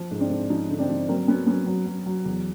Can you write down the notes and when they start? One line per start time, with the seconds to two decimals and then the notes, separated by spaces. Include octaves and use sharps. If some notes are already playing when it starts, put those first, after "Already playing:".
Already playing: F3
0.11 G#2
0.20 C4 D4
0.30 G#2
0.50 F3 C#4 D#4
0.69 D3
0.78 C4 D4
0.89 F3
1.08 F#3 A#3 C4
1.28 F#3 B3 C#4
1.47 F#3 B3 C#4
1.66 F#3
1.86 F#3
2.06 F#3
2.25 E2